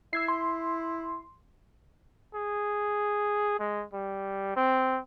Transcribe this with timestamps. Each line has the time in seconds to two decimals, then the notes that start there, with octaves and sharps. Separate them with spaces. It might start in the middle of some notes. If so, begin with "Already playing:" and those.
0.13 E4 E6 G#6 C7
0.28 C6
2.35 G#4
3.60 G#3
3.93 G3
4.57 C4